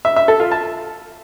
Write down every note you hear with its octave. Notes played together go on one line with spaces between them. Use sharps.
E5
E5
A4
F4
A5